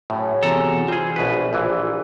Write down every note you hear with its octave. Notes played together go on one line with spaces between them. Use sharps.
F#2 A2 C#3 C#4
E2 C3 F#4 A4 A#5
C3 G3 C4 F4 G#4
A#1 B2 B4
A#1 A#2 E3